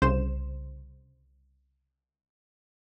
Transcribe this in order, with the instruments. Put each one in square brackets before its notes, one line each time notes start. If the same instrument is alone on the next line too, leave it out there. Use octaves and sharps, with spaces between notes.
[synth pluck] C2 C#3 C5 C6 E7